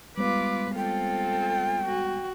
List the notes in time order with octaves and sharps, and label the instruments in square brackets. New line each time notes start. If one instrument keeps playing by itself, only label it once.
[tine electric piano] G3 G#3 B3 [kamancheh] F4 D6 [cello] B4
[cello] C4 F4 [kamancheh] A4 [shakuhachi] G5
[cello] F#4